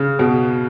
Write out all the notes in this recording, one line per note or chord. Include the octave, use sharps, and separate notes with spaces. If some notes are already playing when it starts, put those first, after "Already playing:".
Already playing: C#3
B2